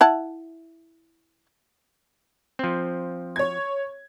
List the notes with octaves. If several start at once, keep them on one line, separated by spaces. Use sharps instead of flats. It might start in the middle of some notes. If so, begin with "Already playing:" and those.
E4 F#5 A5
F3 C4
C#5 G#6